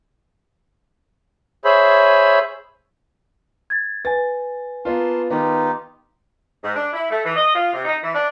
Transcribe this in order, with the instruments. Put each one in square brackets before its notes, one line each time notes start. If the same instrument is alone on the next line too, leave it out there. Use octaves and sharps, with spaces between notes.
[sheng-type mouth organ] G#4 C5 C#5 E5 B5
[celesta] G#6 A6
[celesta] B4 G#5 [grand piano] A6
[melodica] A#3 A5 C6 [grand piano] B3 F4
[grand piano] D#3 B3 [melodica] D#4 F4 G4
[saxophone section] G#2
D4
E4
A3
E3
D#5
F4
C3
D#4
E3
D4